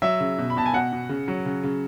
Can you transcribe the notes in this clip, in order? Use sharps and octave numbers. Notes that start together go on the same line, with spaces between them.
F#3 E5
C#3
B2
B5
B2 A5
G#5
B2 F#5
B2
C#3
F#3
C#3
C#3